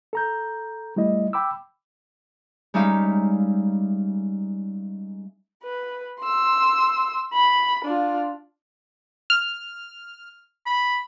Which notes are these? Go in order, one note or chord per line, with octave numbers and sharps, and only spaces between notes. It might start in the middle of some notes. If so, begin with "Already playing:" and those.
A4 A#5 G6
G3 A3 E4 D#5
G5 B5 D6 E6
G3 G#3 C#4 D#4 E5 F5
B4
C6 E6
B5
D4 F4
F6
B5